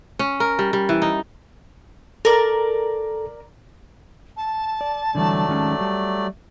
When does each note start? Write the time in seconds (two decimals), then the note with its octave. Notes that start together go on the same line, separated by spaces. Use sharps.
0.19 C#4
0.40 A#4
0.59 G3
0.73 G3
0.89 E3
1.02 D#4
2.25 A4 A#4 D5
4.37 A5
4.81 D5
5.15 D3 E3 F#3 G3 A3 D5
5.49 D#3 G#3 C#4
5.81 G3